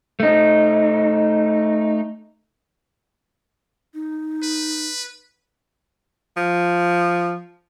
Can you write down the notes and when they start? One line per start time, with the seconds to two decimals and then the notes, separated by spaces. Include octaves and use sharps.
0.20 A3 D#4
3.94 D#4
4.43 B4
6.37 F3